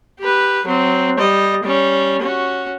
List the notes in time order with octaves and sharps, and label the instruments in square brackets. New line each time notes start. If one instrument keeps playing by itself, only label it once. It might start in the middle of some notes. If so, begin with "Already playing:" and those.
[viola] G4 B4
F#3 C4
G3 D#5
G3 C#4
C#4 F#4